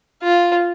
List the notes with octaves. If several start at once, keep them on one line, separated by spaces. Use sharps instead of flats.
F4